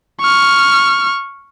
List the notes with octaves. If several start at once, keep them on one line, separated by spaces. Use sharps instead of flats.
C#6 F6